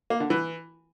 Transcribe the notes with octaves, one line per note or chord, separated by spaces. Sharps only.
A#3
D3
E3